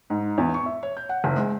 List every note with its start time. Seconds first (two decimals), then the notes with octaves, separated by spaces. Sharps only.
0.10 G#2
0.38 E2
0.54 C#6
0.66 E5
0.83 C#5
0.97 G6
1.09 F#5
1.24 F#1
1.36 G#3